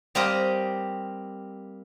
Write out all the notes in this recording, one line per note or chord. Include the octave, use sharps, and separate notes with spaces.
G3 A#3 C4 G4 A#4 D#5